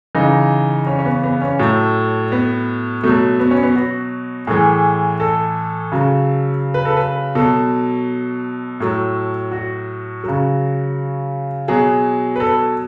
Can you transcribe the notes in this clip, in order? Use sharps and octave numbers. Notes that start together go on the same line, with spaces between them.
C#3 E3 D#4
C#4
C#4
B3
B3
C#4
A2 F#3 A3
B3
B2 F#3 A3
B3
C#4
B3
F#4
A2 E3 G#4
A4
C#3 F#3
B4
A4
B4
B2 F#3 A4
A2 F#3
F#4
C#3 F#3
B2 F#3 G#4
B4
A4